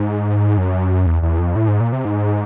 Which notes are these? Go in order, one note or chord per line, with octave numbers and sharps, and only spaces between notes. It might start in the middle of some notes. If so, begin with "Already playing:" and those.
Already playing: G#2
F#2
E2
E2
F2
A2
G#2
A#2
C3
G#2